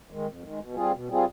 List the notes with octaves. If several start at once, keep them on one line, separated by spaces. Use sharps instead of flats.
D#3 G#3
F2
D#3 G#3
B2
G3 C4 F4 G#4
B2
G3 C4 F4 G#4